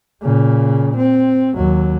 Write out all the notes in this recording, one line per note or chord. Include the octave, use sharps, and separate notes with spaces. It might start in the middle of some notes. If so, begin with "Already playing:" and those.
A#2 C#3
C4
D#2 F#3